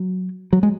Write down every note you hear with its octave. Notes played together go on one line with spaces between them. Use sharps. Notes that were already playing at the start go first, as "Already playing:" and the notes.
Already playing: F#3
F#3
G#3